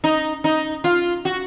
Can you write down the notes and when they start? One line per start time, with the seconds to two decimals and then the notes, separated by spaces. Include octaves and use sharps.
0.04 D#4
0.44 D#4
0.84 F4
1.25 F#4